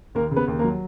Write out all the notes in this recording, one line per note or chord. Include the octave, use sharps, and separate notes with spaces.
D#2 A#3 A#4
C#3
B3 B4
D#2
A#3 A#4
F#3